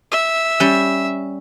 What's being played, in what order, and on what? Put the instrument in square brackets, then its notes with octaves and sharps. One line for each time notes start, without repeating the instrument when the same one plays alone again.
[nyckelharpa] E5
[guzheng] G3 C#4